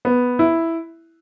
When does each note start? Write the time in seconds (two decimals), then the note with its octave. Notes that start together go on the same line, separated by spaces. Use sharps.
0.05 B3
0.39 E4